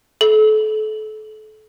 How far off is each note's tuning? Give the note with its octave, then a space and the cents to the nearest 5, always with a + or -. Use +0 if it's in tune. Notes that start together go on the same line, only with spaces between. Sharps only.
A4 -30